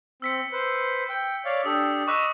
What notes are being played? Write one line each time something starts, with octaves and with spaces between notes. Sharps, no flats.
C4 E6 B6 C#7
B4 C5
G5
C#5 D5 F5
D4 G4 A4 D#6
D#5 B5 C#6 D6 E6 F#6